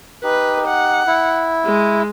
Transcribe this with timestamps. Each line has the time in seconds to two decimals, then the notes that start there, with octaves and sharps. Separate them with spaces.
0.23 D#4 G4 B4
0.67 F#5
1.07 E4
1.66 G#3